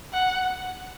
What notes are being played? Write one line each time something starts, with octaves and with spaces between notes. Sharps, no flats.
F#5